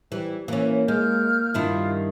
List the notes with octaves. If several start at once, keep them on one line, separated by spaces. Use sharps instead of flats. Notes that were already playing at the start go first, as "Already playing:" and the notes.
E3 G3
E3 A#3 C#4
G#3 F6 G6
G2 D#3 E4 F4